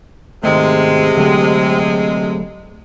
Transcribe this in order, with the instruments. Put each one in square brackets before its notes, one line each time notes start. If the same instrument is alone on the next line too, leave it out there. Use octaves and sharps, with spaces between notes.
[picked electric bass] G#1 D#3 A3 [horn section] C3 G#3
[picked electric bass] D3 F#3 A3